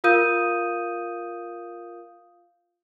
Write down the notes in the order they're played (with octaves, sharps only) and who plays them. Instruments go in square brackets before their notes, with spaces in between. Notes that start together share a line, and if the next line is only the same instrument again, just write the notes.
[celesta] F4 A#4 F5 D#6 G6 D#7